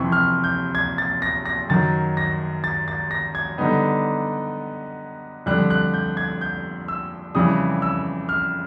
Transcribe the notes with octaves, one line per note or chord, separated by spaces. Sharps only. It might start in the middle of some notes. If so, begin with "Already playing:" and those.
Already playing: F2 C3 E3 C#6
F6
G6
G#6
A6
A#6
A#6
F#2 D#3 F#3 A6
A#6
A6
A6
A#6
G#6
D3 G3 B3 D#4
F2 D3 G3 F#6
F#6
G6
G#6
G6
E6
F2 C#3 E3 G3 D#6
E6
F6